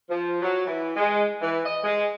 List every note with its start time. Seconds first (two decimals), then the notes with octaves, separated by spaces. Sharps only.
0.10 F3
0.42 F#3
0.66 E3
0.97 G#3
1.41 E3
1.64 D#5
1.84 G#3